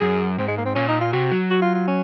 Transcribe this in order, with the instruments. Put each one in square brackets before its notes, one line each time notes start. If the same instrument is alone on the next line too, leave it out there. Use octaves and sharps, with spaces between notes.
[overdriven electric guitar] F#2 [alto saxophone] G#4
[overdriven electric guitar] G#2 [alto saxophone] C4
[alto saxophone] G#3
A#3
C4
[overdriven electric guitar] A#2 [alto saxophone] C#4
[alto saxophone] D#4
F4
[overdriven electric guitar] C3 [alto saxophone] F#4
[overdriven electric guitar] F#3
[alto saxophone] F#4
F4
F4
C#4